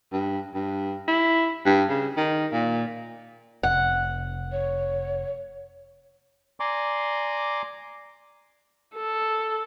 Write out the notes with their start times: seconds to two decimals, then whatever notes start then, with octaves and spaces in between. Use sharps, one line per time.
0.13 G2
0.54 G2
1.08 E4
1.66 G2
1.89 C#3
2.17 D#3
2.53 A#2
3.63 F1 F#5
4.52 C#5
6.60 D5 G#5 A#5 C6 D6
8.95 A4